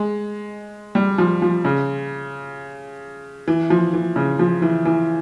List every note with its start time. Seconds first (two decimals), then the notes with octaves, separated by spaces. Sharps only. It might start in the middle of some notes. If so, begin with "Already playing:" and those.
Already playing: G#3
0.95 G3
1.18 F3
1.42 F3
1.65 C#3
3.48 E3
3.70 F3
3.93 E3
4.16 C#3
4.39 F3
4.62 E3
4.85 E3